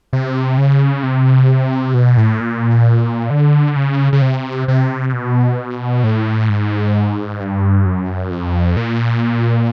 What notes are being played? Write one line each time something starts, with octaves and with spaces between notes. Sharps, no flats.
C3
C#3
C3
B2
A2
A#2
D3
C#3
C#3
C3
C3
B2
A2
G#2
G2
F#2
F2
A#2